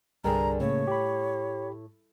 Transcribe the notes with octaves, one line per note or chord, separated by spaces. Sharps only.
C2 G2 D3 G#4 A#4 A#5
A2 C#3 A#3 C#5
G4 B5